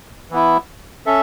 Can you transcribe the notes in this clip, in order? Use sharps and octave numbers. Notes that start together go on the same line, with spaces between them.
E3 B3 E4
C#4 A4 E5